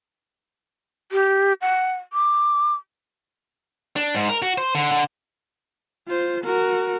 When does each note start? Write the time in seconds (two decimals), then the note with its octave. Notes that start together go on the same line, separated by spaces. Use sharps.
1.12 G4
1.61 F#5
2.13 D6
3.96 D4
4.15 G#2
4.29 A#4
4.42 F#4
4.58 C5
4.75 D3
4.91 D3
6.08 F4 C5
6.44 F#4 A#4